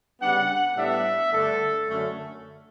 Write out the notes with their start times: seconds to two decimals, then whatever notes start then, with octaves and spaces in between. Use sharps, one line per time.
0.21 C#3 G3 B3 D4 F#5
0.76 A2 G3 B3 D4 E5
1.32 G2 D3 A3 D4 A4
1.89 F#2 D3 A3 C#4